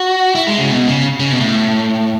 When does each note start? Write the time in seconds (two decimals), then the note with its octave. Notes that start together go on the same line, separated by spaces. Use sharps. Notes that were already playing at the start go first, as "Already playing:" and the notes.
Already playing: F#4
0.35 E4
0.47 G#3
0.58 C#3
0.71 B2
0.88 C#3
1.20 C#3
1.30 B2
1.40 A2